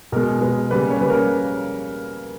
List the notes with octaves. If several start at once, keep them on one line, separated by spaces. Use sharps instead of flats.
B2 G#3 A#4
B2 G#3 B4
C#3 G3 A#3 B4
C#5
C#3 G3 A#3 B4
A#4